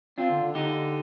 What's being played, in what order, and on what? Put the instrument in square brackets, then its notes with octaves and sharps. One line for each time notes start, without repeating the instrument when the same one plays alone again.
[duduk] C4 [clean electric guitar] D4 F4
[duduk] D3
D3
[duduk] D3 [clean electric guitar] D#4 G4